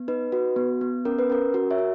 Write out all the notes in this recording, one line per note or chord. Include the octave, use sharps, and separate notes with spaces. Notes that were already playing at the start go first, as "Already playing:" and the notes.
Already playing: B3
D#4 B4
F#4 B4
B3
B3
C#4 A#4
B4
C#4 A#4
F#4 A#4
C#5 E5
F#4